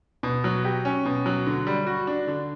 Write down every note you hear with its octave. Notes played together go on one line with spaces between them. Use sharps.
B2
F#3
G4
C#4
B2
F#3
D3
G3
F#4
D4
D3